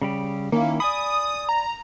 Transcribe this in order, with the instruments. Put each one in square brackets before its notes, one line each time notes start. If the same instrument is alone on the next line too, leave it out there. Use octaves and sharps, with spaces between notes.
[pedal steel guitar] C#3 G3 G4
[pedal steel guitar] D#3 C#4 E4 [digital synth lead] A#3
[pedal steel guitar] D5 G#5 B5 [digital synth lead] D#6
[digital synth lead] A#5